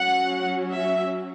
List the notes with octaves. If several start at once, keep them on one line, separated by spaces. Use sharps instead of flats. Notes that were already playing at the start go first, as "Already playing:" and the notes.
Already playing: F#3 C#4 F#5
E5